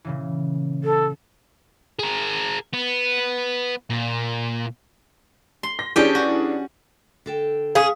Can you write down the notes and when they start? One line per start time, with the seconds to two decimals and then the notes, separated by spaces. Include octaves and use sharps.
0.05 A#2 C#3 E3
0.84 A4
1.99 G#4 A#4
2.73 B3
3.90 A#2
5.63 C6
5.79 A#6
5.96 E3 C#4 D4 G4 G#4 G5
6.15 F#4
7.26 D3 A4 G5
7.75 C#4 G#4 F5 D#6